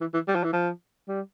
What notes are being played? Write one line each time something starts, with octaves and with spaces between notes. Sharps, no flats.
E3
E3
G3
F3
E3
F3
G3